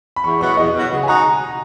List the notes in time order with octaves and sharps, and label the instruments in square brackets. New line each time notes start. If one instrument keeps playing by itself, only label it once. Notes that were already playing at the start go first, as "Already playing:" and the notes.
[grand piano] B5
[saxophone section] E2 [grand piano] C#6
[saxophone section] B2 F#3 B3 F#4 [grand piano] C#6
[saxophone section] E2 [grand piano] D#5
[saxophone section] B2 F#3 B3 F#4
[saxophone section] C#3 [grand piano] F#5
[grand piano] G#5
[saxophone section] G#3 D#4 F#4 [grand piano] A#5